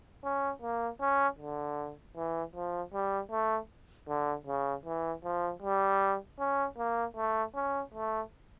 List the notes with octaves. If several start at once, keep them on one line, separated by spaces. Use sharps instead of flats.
C#4
A#3
C#4
D3
E3
F3
G3
A3
D3
C#3
E3
F3
G3
C#4
A#3
A3
C#4
A3